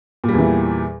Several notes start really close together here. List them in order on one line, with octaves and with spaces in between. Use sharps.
A#2 G3 E2 E3